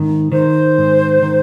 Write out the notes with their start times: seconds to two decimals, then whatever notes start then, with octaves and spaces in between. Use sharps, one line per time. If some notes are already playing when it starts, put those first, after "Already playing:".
Already playing: G#2 D#3
0.32 D#3 C5
0.78 G#2
1.22 D#3